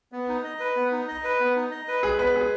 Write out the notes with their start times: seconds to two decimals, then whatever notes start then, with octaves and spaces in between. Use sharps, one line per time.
0.12 B3
0.29 D#4
0.44 D#5
0.60 B4
0.76 B3
0.92 D#4
1.08 D#5
1.24 B4
1.40 B3
1.56 D#4
1.71 D#5
1.88 B4
2.03 G#3 G#4
2.19 B3 B4
2.35 G#3 G#4